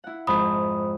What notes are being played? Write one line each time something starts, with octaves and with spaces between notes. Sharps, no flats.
E4 F#5
F2 G#2 C5 B5 D#6